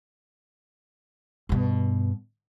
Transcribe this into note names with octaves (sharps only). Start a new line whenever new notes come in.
G2 B2